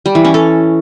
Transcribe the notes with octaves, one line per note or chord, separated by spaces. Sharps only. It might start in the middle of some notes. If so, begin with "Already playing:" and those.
G3
E3
C#4
A4